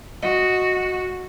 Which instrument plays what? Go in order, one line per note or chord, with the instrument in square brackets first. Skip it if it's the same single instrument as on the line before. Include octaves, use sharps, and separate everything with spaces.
[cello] F#4 [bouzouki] D#5